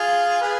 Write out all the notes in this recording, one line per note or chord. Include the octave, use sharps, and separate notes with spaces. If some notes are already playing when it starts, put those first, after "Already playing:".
Already playing: F4 G#4
G#4 B4